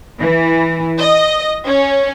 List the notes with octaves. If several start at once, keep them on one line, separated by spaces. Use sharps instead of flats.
E3
D#5
C#4